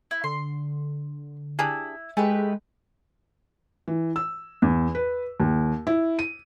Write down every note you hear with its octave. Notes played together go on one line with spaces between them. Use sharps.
E4
D3 C6
D4 E4 G4 G#4
G#3 A3 G4 B4 G#5
E3
E6
E2
B4
D#2
E4
D#7